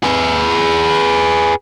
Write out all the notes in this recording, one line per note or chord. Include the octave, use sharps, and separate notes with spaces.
G#4 B4